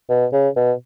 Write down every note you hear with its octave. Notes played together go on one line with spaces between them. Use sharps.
B2
C#3
B2